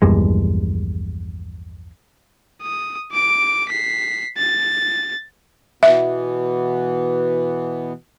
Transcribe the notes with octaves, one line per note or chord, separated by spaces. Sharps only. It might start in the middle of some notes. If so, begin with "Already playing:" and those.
A#1 E2 G2 G#3
D#6
D6 D7
B6 C7
A6
B2 E3 B3 E5